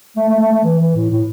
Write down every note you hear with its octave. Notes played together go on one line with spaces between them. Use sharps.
A3
A3
A3
A3
E3
E3
A2
A2